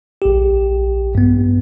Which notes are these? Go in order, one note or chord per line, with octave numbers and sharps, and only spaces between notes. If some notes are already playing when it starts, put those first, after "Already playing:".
A#1 G4
G2 B3